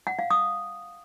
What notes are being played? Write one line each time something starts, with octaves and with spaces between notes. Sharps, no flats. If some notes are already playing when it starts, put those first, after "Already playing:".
F#5
F5
D#6